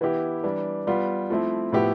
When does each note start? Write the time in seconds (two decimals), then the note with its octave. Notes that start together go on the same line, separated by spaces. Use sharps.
0.01 E3 B3 E4 G4
0.44 E3 G3 D4
0.87 G3 B3 F4
1.30 F3 A3 C4 E4
1.72 A2 F3 B3 E4 G4